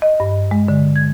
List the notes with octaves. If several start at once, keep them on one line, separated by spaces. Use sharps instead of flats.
D#5
G2
G#3
D3
G#6